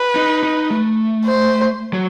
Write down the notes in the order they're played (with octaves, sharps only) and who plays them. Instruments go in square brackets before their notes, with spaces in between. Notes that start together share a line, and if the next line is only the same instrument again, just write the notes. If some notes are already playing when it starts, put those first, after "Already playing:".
Already playing: [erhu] B4
[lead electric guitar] D#4
D#4
A3
[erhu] C5
[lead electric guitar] F#3